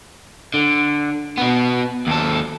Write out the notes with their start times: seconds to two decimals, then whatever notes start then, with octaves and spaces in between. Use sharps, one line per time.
0.54 D3
1.37 B2 B3
2.07 D#2 A4